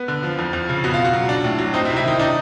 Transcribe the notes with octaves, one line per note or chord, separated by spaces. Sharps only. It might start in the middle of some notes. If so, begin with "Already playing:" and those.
Already playing: B3
D3
F3
F2
F2
C#3
B2 F#4
F4
B2
F#4
F#3
D4
A2
F#3
C4 D#4
E4
C3
E4
D#3 D#4
D4 D#4